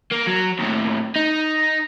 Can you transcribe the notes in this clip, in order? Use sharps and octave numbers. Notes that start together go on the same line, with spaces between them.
A#3
F#3
D#2 A2
D#4